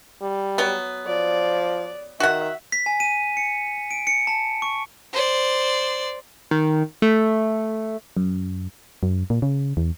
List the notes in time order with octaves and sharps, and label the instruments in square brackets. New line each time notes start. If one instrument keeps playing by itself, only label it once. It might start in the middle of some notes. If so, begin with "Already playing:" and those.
[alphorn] G3
[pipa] F#3 B3
[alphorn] F3 [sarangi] D5
[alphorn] D#3 [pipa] F#4 F#5 [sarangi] E5
[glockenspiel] B6
G#5
D#7
C#7
D7
C#7
A5
C#6
[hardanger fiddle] C5 D5
[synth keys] D#3
A3
[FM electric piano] F#2
[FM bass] F#2
A#2
C#3
E2